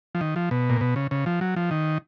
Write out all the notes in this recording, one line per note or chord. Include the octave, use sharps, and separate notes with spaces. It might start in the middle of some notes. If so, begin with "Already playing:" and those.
F3
D#3
F3
B2
A#2
B2
C#3
C#3
F3
F#3
F3
D#3